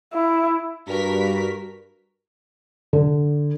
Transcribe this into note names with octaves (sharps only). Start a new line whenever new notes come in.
E4
G2 F#4 A#4 B6
D3